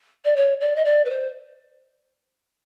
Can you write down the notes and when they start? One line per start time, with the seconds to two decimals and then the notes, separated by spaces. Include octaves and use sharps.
0.24 D5
0.36 C#5
0.60 D5
0.76 D#5
0.84 D5
1.05 B4
1.10 C5